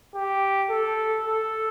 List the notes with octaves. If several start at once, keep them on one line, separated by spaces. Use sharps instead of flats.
G4
A4
A4